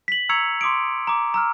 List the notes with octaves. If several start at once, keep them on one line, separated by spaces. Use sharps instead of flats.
B6 F#7
A#5 C#6 E6 G#6 C#7 F7
C6 D6 D#6 D7
A#5 D6
A#5 E6 F6